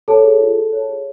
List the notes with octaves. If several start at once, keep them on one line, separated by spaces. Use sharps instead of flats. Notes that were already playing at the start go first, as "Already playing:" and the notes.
A4 C#5 A5
G#4
F4
F4
C#5
G#4